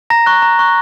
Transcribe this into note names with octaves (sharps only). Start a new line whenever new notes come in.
A#5 A#6
C#6 F#6
A#5
C#6 F#6